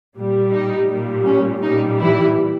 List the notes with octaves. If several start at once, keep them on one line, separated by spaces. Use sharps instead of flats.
A#2 G3
D#4
A#2 G3
C#4
A#2 G3 D#4
E3 E4